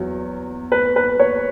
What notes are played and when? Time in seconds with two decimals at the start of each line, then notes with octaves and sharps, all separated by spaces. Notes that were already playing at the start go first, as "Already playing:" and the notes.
Already playing: E2 F#3
0.72 B4
0.96 B4
1.20 C#5